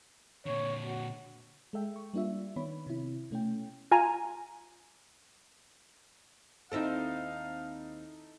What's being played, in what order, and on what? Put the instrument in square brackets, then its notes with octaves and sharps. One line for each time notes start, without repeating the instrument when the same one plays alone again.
[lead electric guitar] A#2 D3 [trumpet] C#5
[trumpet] F#4
[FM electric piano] G#3 A4 E5 G5
C#6
G3 A#3 D4 F4 E5
D#3 B3 C#5 B5
C3 E4
B2 A3 C#4 G5
[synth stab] F4 G#5 A#5
[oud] D#2 C4 E5 [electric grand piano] D#4 E4 A4 [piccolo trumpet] F5